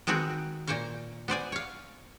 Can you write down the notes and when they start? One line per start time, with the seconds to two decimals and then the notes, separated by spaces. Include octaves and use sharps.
0.07 D#3 G#3 B3 C4 F#4
0.67 A#2 A#3 C5 C#5 F5
1.28 B3 C5 D5 G#5
1.52 C#5 F5